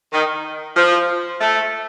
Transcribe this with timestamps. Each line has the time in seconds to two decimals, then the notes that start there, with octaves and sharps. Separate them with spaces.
0.12 D#3
0.76 F3
1.40 A3